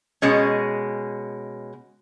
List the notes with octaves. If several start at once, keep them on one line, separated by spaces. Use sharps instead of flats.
B2 G#3 C#4